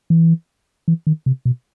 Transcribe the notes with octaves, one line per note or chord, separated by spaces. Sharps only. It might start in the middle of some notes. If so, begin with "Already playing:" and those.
E3
E3
D#3
C3
B2